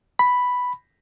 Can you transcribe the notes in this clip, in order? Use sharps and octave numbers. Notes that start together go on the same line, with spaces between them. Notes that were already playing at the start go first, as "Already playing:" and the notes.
B5